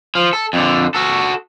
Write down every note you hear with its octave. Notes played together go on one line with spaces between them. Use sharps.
F3
A4
F2 D3
F#4 A4